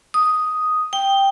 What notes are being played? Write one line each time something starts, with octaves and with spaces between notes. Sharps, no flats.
D#6
G5